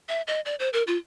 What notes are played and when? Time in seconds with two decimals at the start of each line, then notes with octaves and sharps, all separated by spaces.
0.08 E5
0.27 D#5
0.45 D5
0.59 C5
0.73 A#4
0.87 F4